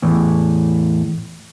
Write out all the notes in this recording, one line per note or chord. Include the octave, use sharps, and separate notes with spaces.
E2 A2